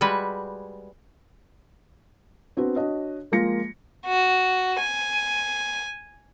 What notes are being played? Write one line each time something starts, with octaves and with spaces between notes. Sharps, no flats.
G3 G#3 F#4 B4
B3 C4 D4 F#4 B4
D4 F#4 C#5 D#5
F3 G#3 A#3 F4 A#6 C#7
F#4
G#5